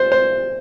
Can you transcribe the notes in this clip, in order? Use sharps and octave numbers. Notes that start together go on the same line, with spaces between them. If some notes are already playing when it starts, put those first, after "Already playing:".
Already playing: C5
C5